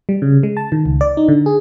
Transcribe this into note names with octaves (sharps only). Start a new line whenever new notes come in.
G3
C#3
G#3
A5
D#3
C#2
D5
D#4
D3
G#4